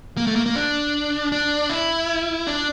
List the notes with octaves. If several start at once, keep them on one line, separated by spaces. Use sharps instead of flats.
A#3
A3
A#3
A#3
D4
D4
E4
D4